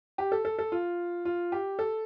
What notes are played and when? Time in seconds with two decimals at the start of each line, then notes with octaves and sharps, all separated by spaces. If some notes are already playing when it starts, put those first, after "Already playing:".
0.18 G4
0.32 A4
0.45 A4
0.59 A4
0.72 F4
1.25 F4
1.52 G4
1.79 A4